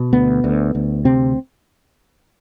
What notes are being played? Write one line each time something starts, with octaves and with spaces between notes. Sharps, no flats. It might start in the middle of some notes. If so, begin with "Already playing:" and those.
Already playing: B2
D2 B3
D2
D2
C3 C4